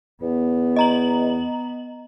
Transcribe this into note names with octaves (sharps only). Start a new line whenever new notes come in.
E2 B3
D#5 A#5 F#7